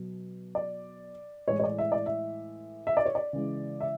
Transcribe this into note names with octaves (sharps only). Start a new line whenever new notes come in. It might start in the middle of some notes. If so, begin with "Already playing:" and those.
Already playing: B2 F#3
D5
A2 E3 G#3 C#5
C#5
D5
E5
D5
E5
E5
D5
C#5
D5
C#3 E3 G#3
E5